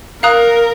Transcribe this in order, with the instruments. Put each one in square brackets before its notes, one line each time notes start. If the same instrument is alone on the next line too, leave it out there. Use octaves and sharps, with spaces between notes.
[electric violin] A#4 [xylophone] F5 A#5 D#6 F#6